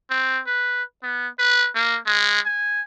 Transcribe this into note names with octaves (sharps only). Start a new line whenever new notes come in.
C4
B4
B3
B4
A#3
G#3
G#5